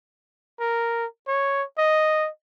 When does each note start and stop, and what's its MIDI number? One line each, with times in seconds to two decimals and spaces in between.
0.60 1.06 70
1.27 1.64 73
1.78 2.28 75